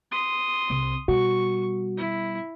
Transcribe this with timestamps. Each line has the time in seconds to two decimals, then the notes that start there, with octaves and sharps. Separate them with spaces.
0.11 C6 D#6
0.70 C2
1.08 B2 G3 F#4 C#6
1.97 E4